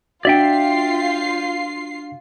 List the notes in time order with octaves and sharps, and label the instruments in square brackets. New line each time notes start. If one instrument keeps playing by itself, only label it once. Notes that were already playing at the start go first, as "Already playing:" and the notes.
[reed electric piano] D4 F#4 [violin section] F4 C7 [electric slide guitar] D5 E5 G5